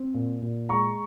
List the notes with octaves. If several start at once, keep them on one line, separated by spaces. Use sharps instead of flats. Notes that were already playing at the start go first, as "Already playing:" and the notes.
Already playing: C4
A#2
A#2
G#3 A#5 C#6